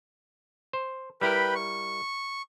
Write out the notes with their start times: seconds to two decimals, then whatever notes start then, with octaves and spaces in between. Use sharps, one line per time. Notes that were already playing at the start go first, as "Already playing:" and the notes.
0.73 C5
1.21 G3 E4 A#4 B4 G5 B5
1.55 C#6